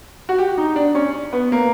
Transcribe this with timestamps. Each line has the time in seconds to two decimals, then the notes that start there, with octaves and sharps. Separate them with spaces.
0.29 F#4
0.38 G4
0.58 D#4
0.76 D4
0.95 C#4
1.33 B3
1.52 A#3